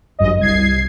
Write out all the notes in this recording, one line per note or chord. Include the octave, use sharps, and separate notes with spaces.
G1 F#2 D#5
C2 G#6 C7